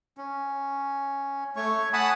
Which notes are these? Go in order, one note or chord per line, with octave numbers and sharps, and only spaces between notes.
C#4
A3 C#5 C#6
F#5 G#5 A5 B5 D#6